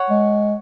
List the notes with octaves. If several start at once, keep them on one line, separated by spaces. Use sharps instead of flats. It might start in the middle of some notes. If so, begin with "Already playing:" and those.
Already playing: C#5 F#5
G#3